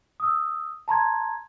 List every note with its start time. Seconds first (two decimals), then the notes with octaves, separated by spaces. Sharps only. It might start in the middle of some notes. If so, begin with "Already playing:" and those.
0.20 D#6 E6
0.88 A5 A#5 C6 G#6